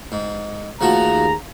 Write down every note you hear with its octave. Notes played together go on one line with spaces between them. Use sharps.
G#2
D#2 F3 A3 F#4 G#4 A#5